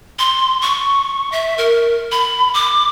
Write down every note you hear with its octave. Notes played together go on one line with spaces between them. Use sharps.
C6
C#6
E5
A#4
B5
D6